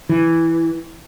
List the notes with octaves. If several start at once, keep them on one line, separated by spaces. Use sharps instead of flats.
E3